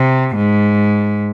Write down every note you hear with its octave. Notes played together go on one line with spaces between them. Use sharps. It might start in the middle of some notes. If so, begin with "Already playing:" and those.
Already playing: C3
G#2